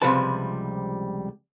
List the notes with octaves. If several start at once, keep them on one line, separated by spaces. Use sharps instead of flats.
C#2 C3 F3 G3 B4 A5